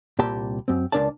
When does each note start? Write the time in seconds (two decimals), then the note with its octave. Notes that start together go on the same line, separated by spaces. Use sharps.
0.19 C2 A#2 G4 G5 A5 B5
0.68 F#2 C4
0.92 C#2 G#2 D4 A#4 D5 A5